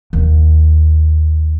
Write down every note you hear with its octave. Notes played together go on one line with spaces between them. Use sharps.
D#2